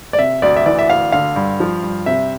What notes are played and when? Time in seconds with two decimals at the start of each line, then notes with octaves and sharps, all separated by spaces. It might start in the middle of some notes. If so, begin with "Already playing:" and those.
0.13 D5
0.19 C3 E5
0.42 D2 D5
0.56 E5
0.66 E3 D5
0.79 E5
0.90 D2 F5
1.12 D3 F5
1.36 G2
1.60 F3
1.83 G2
2.06 C3 E5